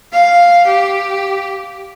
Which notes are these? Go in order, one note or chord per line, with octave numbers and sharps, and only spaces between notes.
F5
G4